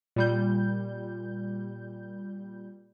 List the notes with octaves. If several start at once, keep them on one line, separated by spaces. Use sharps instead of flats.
A#2 G3 G6